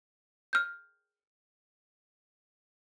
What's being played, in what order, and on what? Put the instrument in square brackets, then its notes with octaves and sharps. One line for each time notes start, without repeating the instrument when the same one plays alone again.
[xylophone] F6 G6